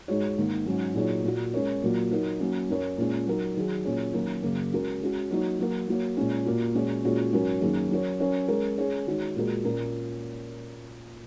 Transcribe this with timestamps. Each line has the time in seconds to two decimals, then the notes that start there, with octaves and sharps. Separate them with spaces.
0.08 G#2 G#3 D#4 F#4 C#5
0.38 G#2 D#3 A#3
0.66 G#2 F#3 C#4
0.95 A#2 F#3 D#4 G#4 C#5
1.24 A#2 A#3 F#4
1.54 G#3 C#4 A#4 C#5
1.83 A#2 F#3 A#3 F#4
2.11 F#3 D#4 A#4
2.40 F#3 A#3 C#4
2.69 F#2 F#3 C#4 A#4 C#5
2.98 A#2 G#3 C#4
3.27 F#3 D#4 A#4
3.57 D#3 F#3 D#4 G#4
3.85 A#2 F#3 C#4 G#4 C#5
4.14 D#3 F#3 A#3 C#4 A#4
4.43 F#2 C#3 A#3
4.72 G#3 C#4 F#4 A#4
5.01 G#3 C#4 F#4
5.31 F#3 A#3 D#4 F#4 C#5
5.59 F#3 A#3 F#4 A#4
5.88 F#3 A#3 F#4 C#5
6.17 A#2 G#3 C#4
6.46 A#2 A#3 F#4
6.75 A#2 G#3 C#4 F#4 C#5
7.04 A#2 G#3 C#4 F#4 C#5
7.32 G#2 F#3 C#4 F#4 A#4
7.61 F#2 D#3 A#3 C#4 G#4
7.91 F#3 C#4 A#4 C#5
8.20 F#3 C#4 A#4 C#5
8.48 G#3 C#4 A#4 C#5
8.78 G#3 C#4 G#4 C#5
9.07 D#3 G#3 F#4 C#5
9.36 A#2 G#3 F#4 A#4
9.64 A#2 A#3 C#4 A#4